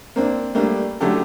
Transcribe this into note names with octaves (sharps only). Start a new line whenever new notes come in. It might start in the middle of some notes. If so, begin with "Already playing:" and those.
A#3 C4 D4
G3 A3 A#3 D4
D3 F#3 A3 C#4 G4 A4